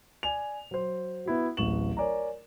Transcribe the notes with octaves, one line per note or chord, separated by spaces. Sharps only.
D5 G#5 F7
F#3 C5
B3 E4 F#4
D1 A1 C#6 E7 F#7
A#4 C#5 D5 G#5 A#5